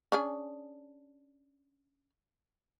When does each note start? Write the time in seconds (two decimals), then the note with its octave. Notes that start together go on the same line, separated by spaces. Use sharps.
0.12 C#4 D4 G#4